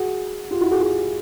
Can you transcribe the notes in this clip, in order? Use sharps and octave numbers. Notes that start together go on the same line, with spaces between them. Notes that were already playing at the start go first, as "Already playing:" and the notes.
Already playing: F#4 G#4
F4 G4
E4 F#4
F#4 G#4
F#4 G#4